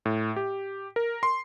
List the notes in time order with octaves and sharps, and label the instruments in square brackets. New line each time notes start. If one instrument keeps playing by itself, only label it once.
[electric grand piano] A2
G4
A#4
C6